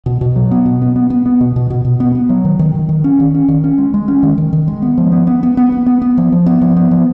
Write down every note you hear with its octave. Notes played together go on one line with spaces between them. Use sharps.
B2
B2
F#3
B3
B2
B3
B3
B3
B3
B2
B2
B2
B2
B3
B3
F#3
D#3
D#3
D#3
D#3
C#4
D#3
C#4
D#3
C#4
G#3
G#3
C#4
D#3
D#3
D#3
G#3
B3
F3
B3
B3
B3
B3
B3
B3
B3
F3
F3
B3
F3
B3
F3